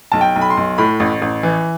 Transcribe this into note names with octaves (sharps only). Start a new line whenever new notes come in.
B1 A5
G5
B1
B5
C6
B1
A2 B5
A1
A1
E3